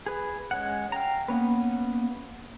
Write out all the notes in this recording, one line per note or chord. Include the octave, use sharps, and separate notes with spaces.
G#4 B4
G#3 C#4 F#5
F5 G5 A#5
A#3 B3 C#4 B4